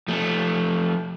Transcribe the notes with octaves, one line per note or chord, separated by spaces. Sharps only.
F3 A3